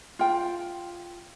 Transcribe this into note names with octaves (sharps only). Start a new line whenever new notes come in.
F4 G5